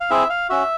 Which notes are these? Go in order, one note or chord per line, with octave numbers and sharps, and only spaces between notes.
F5
C4 E4 G#4 E5
F5
C#4 F#4 E5